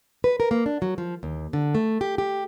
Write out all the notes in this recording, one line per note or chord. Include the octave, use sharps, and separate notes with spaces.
B4
A#4
A#3
D4
F#3
F3
D#2
D3
A3
G4
G4